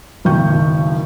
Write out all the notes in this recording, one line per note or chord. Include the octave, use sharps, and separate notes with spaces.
F#1 B1 D#3 G5 C#6 G6